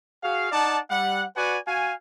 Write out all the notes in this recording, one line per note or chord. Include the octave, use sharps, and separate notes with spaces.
F#4 G#4 F5
D#4 D5 F#5 A5
G3 F#5
F#4 B4 D5 F#5 G#5
F#4 F5 G#5